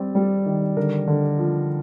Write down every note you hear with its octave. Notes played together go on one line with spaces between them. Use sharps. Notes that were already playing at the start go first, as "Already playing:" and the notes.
Already playing: G3 C4 D5
G3
D#3
D3 A#4
D3
F3